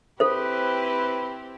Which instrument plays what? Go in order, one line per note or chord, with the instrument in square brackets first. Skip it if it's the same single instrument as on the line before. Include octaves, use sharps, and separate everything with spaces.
[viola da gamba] C4 E4 G4 [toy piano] A4 C5 [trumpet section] B4